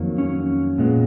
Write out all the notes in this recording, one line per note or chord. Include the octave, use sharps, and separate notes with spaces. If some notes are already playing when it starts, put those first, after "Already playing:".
Already playing: F2 D#3 F#3 A#3
C#4
A#2 G#3 B3